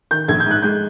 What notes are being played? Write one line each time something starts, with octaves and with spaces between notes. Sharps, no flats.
D#3 G6
A#1 G#6
G6
G#2 F#6
G#3 G6